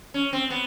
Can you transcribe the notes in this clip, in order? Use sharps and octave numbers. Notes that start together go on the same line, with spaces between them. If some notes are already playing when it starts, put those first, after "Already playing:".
C#4
C4
B3